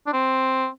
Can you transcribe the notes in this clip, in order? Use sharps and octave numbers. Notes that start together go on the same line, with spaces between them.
D4
C4